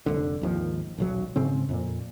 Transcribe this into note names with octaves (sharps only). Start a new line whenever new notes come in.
F1 B1 D3
G#1 D#2 F3
D#1 B1 F#3
G#2 C#3 C4
F2 A#2